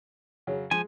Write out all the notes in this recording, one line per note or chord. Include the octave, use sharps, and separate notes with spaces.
C#3 F#3
F3 G#3 G#5